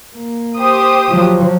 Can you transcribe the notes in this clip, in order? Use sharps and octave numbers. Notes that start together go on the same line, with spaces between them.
A#3
G4 C5 D#6
F3 F#3